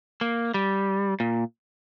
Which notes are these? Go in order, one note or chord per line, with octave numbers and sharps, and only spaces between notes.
A#3
G3
A#2